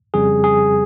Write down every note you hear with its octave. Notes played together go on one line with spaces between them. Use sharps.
F2 C#3 G3 G#4
G#4